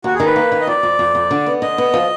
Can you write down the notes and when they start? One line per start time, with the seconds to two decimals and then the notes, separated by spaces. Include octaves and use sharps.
0.04 D#2 F#4
0.15 G#4
0.20 D#3
0.25 B4
0.36 A#3
0.52 D#3
0.61 D#5
0.67 F2 D5
0.83 F2
0.99 F2
1.15 F2
1.31 D3
1.46 B3
1.62 D3 D#5
1.78 B3
1.94 F3